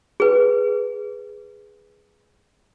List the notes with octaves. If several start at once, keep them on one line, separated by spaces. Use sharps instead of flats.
G#4 B4